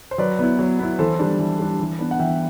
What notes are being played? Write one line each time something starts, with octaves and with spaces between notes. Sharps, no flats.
C5
F#3 B4 D5
B3 E4
F#3
B3 E4
E3 A4 C5
G3 D4
E3
G3 D4
E3
B3 D4
F#5
E3 E5 G5